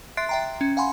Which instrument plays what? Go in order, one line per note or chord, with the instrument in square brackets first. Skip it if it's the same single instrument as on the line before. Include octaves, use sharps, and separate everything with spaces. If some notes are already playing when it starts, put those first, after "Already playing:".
[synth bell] E5 C6 F#6 A6 C7 D7
E5 G5 A#5
C#4
F5 F#5 G#5 B5 C6